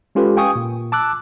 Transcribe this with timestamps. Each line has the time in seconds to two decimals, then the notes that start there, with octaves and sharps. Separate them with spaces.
0.15 G#3 C#4 F4 G4 A4 B4
0.36 F5 G5 G#5 C#6 D#6
0.56 A#2
0.92 A5 D6 E6 F#6